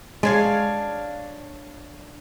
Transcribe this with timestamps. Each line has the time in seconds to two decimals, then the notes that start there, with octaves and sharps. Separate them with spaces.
0.23 G#3 D4 C#5 F5